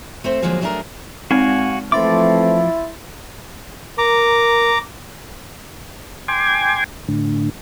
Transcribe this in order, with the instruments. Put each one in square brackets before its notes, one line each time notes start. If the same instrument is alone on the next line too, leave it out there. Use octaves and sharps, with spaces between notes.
[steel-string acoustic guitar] A3 C4 C5
D3 F3 F#3 G#3 A#3 G#4
F#3 A3 D4 G#4 A#4
[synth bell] G#3 C4 D#4 [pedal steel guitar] F#4 F5 G#5
[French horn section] E3 A3 C4 [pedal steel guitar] F3 D6 [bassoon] E4 [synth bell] C6 A6
[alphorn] A#4 [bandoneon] A#5 D6
[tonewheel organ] G5 G#5 C6 D6 G#6
A2 D3